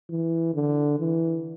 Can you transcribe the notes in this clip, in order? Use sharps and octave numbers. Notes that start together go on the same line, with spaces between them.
E3
D3
E3